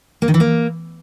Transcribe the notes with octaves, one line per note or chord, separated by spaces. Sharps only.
A#3
D#3
E3
A#3